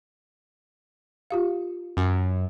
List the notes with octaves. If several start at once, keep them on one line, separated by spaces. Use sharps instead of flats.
F4 G4 F5
F#2